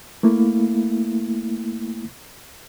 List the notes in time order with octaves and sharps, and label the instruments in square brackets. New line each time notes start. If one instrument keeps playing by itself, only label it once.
[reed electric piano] A3 A#3 E4